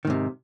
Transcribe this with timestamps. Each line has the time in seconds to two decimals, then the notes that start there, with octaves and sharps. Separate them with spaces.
0.05 D#3
0.07 G#2
0.10 C3